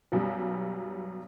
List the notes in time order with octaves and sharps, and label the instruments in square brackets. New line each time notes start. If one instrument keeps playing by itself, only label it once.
[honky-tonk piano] B1 F#2 B2 G3